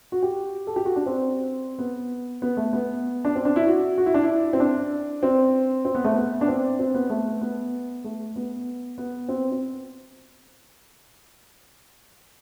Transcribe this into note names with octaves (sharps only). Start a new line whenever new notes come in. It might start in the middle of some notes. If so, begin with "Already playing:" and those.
F#4
G4
A4
G4
F#4
D4
C4
B3
B3
A3
B3
D4
C4
D4
E4
F#4
F#4
E4
D4
E4
C4
D4
C4
C4
B3
A3
B3
D4
C4
C4
B3
A3
B3
A3
B3
B3
C4
C4